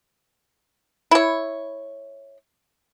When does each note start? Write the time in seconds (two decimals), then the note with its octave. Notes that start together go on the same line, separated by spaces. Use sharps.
1.11 E4 C#5